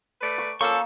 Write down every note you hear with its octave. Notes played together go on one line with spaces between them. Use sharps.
A3 B4 D5
C#6
F3 A#3 C#4 A4 C#6 E6